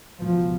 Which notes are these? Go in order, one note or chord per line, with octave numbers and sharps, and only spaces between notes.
C#2 B2 F3